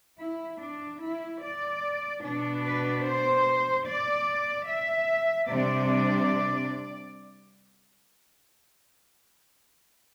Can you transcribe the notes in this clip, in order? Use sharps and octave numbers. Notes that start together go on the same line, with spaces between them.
E4
D4
E4
D5
B2 B3 D4
B4
C5
D5
E5
C3 G3 D4 D5